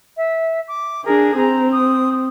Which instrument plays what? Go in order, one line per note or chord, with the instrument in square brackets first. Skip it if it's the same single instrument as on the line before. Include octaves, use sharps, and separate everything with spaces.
[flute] E5
D6
[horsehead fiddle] D4 G#4 [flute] A#4
[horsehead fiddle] C4 [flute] A#5
[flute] D#6